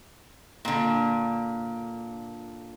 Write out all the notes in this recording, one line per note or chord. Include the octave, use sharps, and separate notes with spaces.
A#2 D3